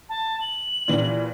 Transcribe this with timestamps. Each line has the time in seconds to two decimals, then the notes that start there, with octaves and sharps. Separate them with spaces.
0.09 A5
0.40 F#7
0.88 A#2 E3 G3